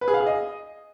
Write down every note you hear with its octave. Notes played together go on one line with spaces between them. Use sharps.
B4
G#4
F5
G#4
D#5